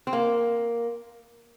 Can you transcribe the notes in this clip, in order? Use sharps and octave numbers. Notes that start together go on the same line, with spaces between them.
C4
A#3